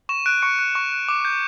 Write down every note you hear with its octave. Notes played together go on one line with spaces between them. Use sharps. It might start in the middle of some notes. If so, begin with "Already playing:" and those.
C#6 E7
F#6 D7
C#6 C#7
F#6
C#6
F#6
D6
G6